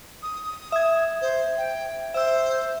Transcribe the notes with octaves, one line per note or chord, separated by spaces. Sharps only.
D#6
E5 G#6
C5
G5
C5 E5 E6